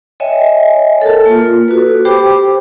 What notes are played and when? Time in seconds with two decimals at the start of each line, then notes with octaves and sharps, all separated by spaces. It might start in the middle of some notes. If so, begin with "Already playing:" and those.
0.20 C#5 D#5 E5 G5 G#5
1.02 A4 A#4 A5
1.26 A#3 F4
1.68 F#4 A4 B4
2.05 G4 C5 G5 B5 D6